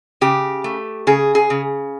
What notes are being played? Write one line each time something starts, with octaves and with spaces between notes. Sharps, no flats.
C#3 G4
A3
C#3 G#4
G#4
C#3